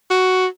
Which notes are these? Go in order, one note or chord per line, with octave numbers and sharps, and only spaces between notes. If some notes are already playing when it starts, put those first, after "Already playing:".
F#4